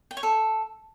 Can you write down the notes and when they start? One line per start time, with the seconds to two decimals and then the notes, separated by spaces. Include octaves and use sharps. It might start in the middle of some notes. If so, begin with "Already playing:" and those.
0.11 G5
0.17 C#5
0.23 A4